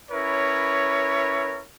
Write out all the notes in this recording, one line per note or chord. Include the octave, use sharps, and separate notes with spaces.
C#4 E4 A#4 B4 C#5